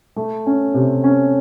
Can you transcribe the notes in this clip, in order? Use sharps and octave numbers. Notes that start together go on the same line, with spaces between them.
A3
C#4
C3
C#4